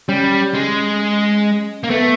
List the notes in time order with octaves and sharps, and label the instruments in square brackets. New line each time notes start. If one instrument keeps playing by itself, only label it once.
[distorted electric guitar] G3 [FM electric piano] C#4
[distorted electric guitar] G#3
A#3
[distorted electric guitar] A3 [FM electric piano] B3